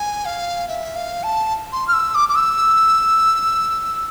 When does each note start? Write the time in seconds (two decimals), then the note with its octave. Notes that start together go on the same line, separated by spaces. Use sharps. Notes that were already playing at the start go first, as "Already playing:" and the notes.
Already playing: G#5
0.25 F5
0.68 E5
0.96 F5
1.23 A5
1.73 C6
1.88 F6
1.93 E6
2.15 D6
2.29 D6
2.35 E6